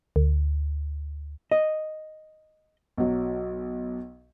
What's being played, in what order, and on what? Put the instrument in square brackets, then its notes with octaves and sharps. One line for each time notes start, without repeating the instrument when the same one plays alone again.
[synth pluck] D2
[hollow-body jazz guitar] D#5
[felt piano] B1 F#3